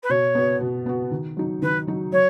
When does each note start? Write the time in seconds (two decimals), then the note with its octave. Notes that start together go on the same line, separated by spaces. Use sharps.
0.03 B4
0.10 B2 C#5
0.35 B3 F#4
0.61 B2
0.86 B3 F#4
1.11 D#3
1.37 F#3 D#4
1.62 D#3 B4
1.87 F#3 D#4
2.12 F#3 C#5